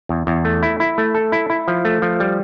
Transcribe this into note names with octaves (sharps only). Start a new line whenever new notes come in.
E2
E2
A3
E4
E4
A3
A4
E4
E4
F3
A3
F3
G3